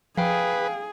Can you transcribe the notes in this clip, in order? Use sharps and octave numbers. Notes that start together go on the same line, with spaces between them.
F3 G#4 B4 F5 G5